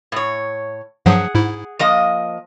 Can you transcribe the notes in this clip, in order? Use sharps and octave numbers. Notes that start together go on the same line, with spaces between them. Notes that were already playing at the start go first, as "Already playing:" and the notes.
A2 C#5
G2 F3 F#3 G#4 F#5
G#2 E4
F3 A#3 D#5